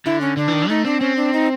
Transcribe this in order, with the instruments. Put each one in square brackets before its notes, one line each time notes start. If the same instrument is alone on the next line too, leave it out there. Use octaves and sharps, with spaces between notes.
[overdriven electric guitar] D3 [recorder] E4
[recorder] C#4
[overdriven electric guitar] D3 [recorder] D4
[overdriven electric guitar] E3
D#3
[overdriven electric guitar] A3 [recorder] D#4
[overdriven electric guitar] C4 [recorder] D4
[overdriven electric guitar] C4 [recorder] C#4
[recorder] D4
D#4